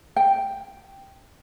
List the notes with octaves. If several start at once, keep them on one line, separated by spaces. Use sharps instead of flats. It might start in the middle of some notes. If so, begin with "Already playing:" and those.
G5